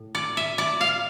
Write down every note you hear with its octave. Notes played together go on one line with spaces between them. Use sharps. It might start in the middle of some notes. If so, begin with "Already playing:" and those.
Already playing: A2
D5
E5
D5
F5